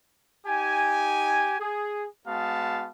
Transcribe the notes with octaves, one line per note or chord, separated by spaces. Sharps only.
D#4 G4 G#5
G#4
G#3 B3 F#4 F5 A5